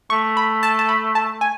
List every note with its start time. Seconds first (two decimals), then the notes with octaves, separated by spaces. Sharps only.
0.10 A3 C#6
0.37 B5
0.63 A5
0.79 A5
0.89 B5
1.15 A5
1.41 G#5